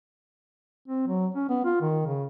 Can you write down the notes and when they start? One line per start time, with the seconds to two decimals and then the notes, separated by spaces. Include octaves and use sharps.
0.88 C4
1.08 F#3
1.35 C#4
1.49 B3
1.65 F4
1.81 D#3
2.06 C#3